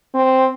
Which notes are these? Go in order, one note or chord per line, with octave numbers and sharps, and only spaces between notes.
C4